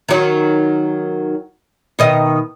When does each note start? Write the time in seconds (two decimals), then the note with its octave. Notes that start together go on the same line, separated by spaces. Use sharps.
0.09 D#3 F#3
1.99 B2 D#3 D#5